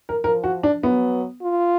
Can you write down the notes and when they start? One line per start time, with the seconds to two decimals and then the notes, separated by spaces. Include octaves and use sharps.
0.09 A#4
0.24 F3 A#4
0.44 F#4
0.63 D4
0.83 F#3 B3
1.43 F4